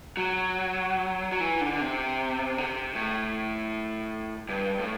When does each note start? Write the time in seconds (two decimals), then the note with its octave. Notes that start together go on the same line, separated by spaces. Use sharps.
0.17 F#3
1.32 F#3
1.40 E3
1.61 D3
1.72 D3
1.81 C3
2.58 D3
2.63 C3
2.95 A2
4.49 G2
4.79 A2